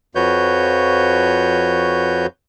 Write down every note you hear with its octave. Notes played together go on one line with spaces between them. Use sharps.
F2 F3 F#4 B4 C#5 G6